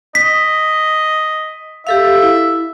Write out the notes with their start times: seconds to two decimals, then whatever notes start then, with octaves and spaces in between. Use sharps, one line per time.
0.15 D#5 B6
1.87 G4 A4 E5 F5
2.22 E4